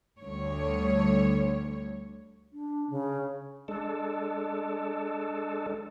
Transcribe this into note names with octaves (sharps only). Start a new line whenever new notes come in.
D2 D3 G3 C#5
D4
C#3
G#3 D4 A4